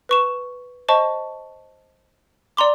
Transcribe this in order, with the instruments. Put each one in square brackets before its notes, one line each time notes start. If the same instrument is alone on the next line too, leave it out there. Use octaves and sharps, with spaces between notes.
[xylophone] B4 C#6 E7
C5 D#5 A5 C#6
D5 A#5 C6 D6